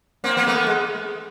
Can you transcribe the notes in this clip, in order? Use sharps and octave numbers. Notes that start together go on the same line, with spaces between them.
A#3 C4
A#3
A3 B3
G#3